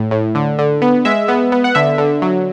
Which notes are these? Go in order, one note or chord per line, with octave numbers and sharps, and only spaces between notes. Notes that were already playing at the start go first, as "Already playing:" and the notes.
Already playing: A2
A2
D3
D3
B3
G#3 E5
B3
B3
F#5
D3 E5
D3
F#3